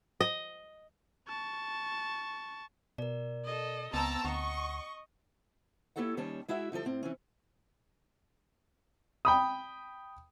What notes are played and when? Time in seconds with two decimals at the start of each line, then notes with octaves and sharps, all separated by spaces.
0.21 D#5
1.28 A5 C#6
2.98 B2 A#4 D5
3.45 A4 D#5
3.94 C#2 B3 C4 A5 A#5 E6
4.25 D2 D#5 F#5 C#6
5.96 A#3 E4 G4 A4 C#5 F#5
6.17 D#2 D#3 G3 C#4 C#5 A5
6.48 G#3 E4 F#4 G#4 E5
6.72 D3 F3 G3 A4
6.85 A2 C4
7.03 E3 C4 C#4
9.25 G5 B5 D#6